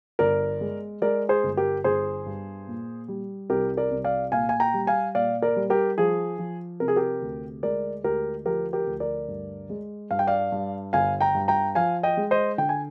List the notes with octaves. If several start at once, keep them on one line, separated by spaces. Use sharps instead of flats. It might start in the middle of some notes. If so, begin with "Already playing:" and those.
G1 A#4 D5
G#3
G#3 A#4 D5
G#4 C5
G1
G4 A#4
G1 G#4 C5
G2
A#2
G3
C2 G4 A#4
A#4 D5
C2
D5 F5
A#2 F5 G#5
G#5
G5 A#5
G3
F5 G#5
A#2 D5 F5
A#4 D5
G3
G4 A#4
F3 G#4
F3
C3 A#4
G#4
G4 A#4
D2
G#3 A#4 D5
D2 G4 A#4
F3 G4 A#4
G4 A#4
D2
A#4 D5
G2
G#3
G2 F5
G5
D5 F5
G2
G1 F5 G#5
G5 A#5
G2
G5 A#5
F3 F5 G#5
D#5 G5
G#3
C5 D#5
D3 G5
G#5